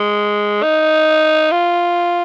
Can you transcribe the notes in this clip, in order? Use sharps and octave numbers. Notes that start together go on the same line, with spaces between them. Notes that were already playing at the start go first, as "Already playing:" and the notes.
Already playing: G#3
D#4
F4